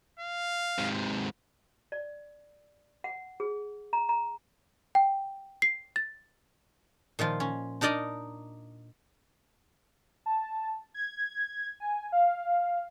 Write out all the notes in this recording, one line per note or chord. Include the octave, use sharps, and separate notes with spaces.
F5
G#2 C3
D5
F#5
G#4
A#5
A#5
G5
C7
A6
A#2 D#3 F3 F4
C#4
D4 D#4 A#4 D5 D#5
A5
G#6
G#5
F5